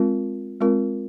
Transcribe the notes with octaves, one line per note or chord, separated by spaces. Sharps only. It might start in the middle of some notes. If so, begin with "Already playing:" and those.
Already playing: G#3 C4 F4 A#4
G#3 C4 F4 A#4